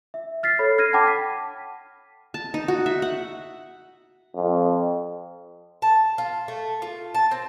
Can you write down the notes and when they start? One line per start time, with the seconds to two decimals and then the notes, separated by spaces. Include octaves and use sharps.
0.14 E5
0.43 F6 A6 B6 C7
0.59 A4 C#5 B5
0.78 F6 G#6 A#6 C7 D#7
0.93 F#5 G5 A5 B5 D6
1.07 B6
2.34 A5
2.54 D#4
2.68 F#4
2.86 E5
3.02 F#5
4.35 F2
5.82 A5
6.18 F4
6.48 A3
6.82 F4
7.15 A5
7.31 C4